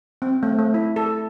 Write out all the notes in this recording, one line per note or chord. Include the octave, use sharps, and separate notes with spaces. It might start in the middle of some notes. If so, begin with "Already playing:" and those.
C4
A3
A3
E4
A4